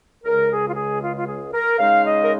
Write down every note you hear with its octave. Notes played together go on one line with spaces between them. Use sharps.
C#2 C#3 G#3 A#4
G#4
F4
G#4
F4
F4
G#4
A#4
C#3 G#3 D#4 F5
D#5
A#4